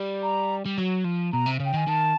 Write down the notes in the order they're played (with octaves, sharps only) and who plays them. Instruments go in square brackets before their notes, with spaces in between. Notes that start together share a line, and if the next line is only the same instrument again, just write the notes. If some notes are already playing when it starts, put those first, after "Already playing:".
Already playing: [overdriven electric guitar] G3
[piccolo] A#5
[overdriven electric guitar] G3
F#3
F3
[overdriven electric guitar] B2 [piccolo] A#5
[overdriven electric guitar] C3
C#3
[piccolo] G5
[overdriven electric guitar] D#3 [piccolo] G#5
[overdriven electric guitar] D#3 [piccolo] A5